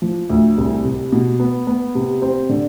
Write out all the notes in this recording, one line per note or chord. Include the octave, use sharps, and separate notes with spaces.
F3
D2
C2
C3
B2
B3
B3
C3
C4
D3